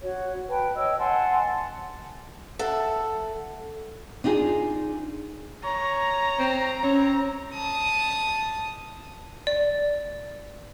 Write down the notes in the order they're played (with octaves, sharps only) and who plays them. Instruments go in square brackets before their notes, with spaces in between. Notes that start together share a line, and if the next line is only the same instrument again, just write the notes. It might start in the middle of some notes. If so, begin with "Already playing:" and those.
[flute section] F#4 C#5
B4 G5 A5
C#5 D#5 G5 E6
F#5 G#5 A5 C6
[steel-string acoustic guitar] A4 E5 F#5 A5
[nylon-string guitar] D4 D#4 F4 G4 G#4
[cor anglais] C#5 [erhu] A#5
[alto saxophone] C4
[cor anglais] C4 [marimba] C#4 [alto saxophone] C#5
[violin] A5 D#6
[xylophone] D5